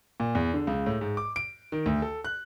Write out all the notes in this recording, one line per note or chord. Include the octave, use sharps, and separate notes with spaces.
A#2
E2
D3
C#2
A2
G#2
D6
D7
D#3
D2
A4
F#6